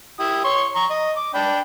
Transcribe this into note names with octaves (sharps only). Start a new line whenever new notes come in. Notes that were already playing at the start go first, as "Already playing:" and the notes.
E4 G4 D#6
C#5 C6 C#6
A#5 C#6
D#5
D6
D4 G5 B5